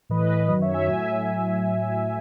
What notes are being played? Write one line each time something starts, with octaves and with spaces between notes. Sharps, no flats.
A2 E3 B4 D#5
F#2 D#3 F#3 B4 D#5
C#5 E5
E5 G#5
A2 F#3 E5 G#5